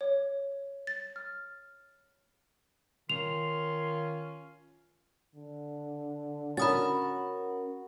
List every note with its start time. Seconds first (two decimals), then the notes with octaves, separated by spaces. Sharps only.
0.01 C#5
0.87 A6
1.16 F6
3.10 D#3 C#4 F4 C6 F7
5.35 D3
6.57 C#4 F#4 A#4 B5 D#6 A6